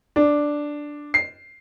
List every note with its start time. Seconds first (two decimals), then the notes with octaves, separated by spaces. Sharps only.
0.16 D4
1.14 C7